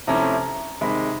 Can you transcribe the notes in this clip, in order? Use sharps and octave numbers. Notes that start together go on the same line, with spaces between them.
C3 F3 A3 C#4 E4 A#5
C3 D#3 G#3 B5